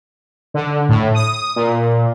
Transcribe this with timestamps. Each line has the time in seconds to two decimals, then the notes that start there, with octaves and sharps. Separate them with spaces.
0.54 D3
0.89 A2
1.14 D#6
1.56 A#2